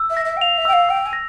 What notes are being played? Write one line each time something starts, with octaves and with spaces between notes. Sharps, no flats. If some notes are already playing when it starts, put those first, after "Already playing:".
Already playing: E6
E5
A#6
E5
G5
F5 F7
E5
G5 E6
F5
G5 E6
G#5
A#6